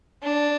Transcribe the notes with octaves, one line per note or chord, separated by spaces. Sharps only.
D4